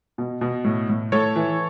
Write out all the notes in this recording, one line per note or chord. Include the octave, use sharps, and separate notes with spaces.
B2
B2
A2
A2
A2 A4 C#5
E3